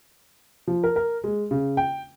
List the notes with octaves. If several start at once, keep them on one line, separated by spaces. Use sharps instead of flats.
F3
A#4
A#4
G#3
C#3
G5